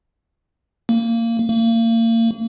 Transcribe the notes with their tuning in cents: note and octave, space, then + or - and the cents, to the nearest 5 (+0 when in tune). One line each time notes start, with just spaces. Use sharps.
A#3 -20
A#3 -35